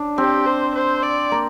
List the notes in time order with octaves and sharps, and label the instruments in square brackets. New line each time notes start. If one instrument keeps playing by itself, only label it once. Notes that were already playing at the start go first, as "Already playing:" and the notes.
Already playing: [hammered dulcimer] D4
[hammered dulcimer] C4 [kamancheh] G4
[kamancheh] C5
C5
D5
[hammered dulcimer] A#3